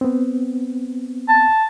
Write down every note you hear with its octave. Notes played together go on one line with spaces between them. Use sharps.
B3 C4
A5